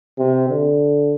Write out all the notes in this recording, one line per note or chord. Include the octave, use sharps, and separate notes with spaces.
C3
D3